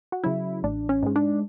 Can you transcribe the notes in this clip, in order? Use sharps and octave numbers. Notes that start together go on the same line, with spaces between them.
F#4
C#3 F#3 E4
A1 D4
C#4
G#2 G#3
D4